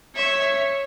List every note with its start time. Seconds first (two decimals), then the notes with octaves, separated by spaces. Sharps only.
0.15 C#5 E5